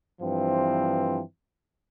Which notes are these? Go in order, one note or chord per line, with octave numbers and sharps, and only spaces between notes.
G2 E3 F3 C4